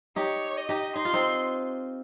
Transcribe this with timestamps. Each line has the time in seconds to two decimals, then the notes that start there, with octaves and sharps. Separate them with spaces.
0.16 D#4 G4 C#5
0.57 D#5
0.69 D#4 G4
0.95 D#4 C6
1.05 F4
1.13 C4 D#4